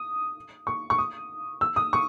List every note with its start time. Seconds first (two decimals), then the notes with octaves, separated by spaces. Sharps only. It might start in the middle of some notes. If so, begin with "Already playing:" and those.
Already playing: D#6
0.67 C#6
0.90 C#6
0.98 D#6
1.61 E6
1.76 D#6
1.93 C#6